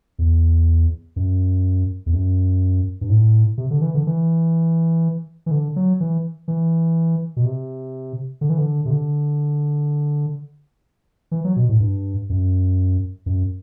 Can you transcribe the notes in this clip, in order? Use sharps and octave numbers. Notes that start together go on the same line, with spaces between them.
E2
F#2
E2
F#2
G2
A2
C3
D3
E3
D3
E3
E3
D3
F#3
E3
E3
B2
C3
D3
E3
D3
C3
D3
E3
F#3
B2
A2
G2
F#2
F#2